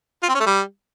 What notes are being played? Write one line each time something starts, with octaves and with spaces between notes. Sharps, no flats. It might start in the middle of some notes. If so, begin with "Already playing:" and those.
F4
C4
C#4
A3
G3